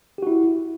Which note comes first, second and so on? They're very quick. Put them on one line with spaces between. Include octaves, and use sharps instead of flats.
G4 F#4 E4